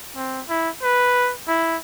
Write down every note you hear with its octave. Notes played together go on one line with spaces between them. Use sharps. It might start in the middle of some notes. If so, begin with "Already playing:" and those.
C4
E4
B4
E4